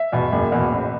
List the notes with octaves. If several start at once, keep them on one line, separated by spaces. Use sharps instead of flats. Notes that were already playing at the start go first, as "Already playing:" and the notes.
Already playing: E5
E2 B2
F#1
E2 B2
A1